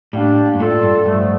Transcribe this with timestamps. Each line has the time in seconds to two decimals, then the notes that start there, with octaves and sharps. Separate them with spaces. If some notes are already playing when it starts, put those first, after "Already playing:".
0.13 A2 G3 A#3 D4 G4
0.55 G2
0.60 A2 A3 D4 F4 A4
0.83 G2
1.06 G2 D3 F3 A3